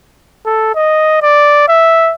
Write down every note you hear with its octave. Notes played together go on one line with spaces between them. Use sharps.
A4
D#5
D5
E5